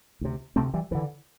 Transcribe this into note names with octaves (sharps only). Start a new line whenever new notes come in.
D2 C3
D2 C3 A3 C4
E3 G3
D2 D3 E3